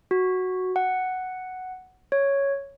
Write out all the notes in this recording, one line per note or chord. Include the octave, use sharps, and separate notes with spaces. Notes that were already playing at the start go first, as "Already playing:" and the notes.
F#4
F#5
C#5